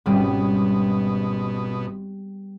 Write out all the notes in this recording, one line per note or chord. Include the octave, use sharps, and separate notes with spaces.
G#1 B2 G3 B3 C#4